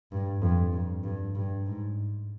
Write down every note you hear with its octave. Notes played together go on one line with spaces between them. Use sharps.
G2
F2
G2
G2
G2
G#2